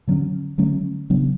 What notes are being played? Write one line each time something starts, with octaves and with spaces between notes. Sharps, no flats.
D3 F#3 A3 C#4
D3 F#3 A3 C#4
C#3 F#3 B3 D4